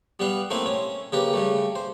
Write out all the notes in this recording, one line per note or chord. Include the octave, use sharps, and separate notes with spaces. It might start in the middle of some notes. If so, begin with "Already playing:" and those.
G3 B3 B4 F5
A3 A#3 C4 E4 C5 E5
C#4
C#3 A#3 G4 B4
C#3 G3 A3
C5